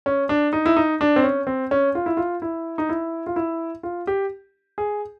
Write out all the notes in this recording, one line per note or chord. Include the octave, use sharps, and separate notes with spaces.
C#4
D4
D#4
E4
D#4
D4
C4
C#4
C4
C#4
F4
E4
F4
E4
D#4
E4
F4
E4
F4
G4
G#4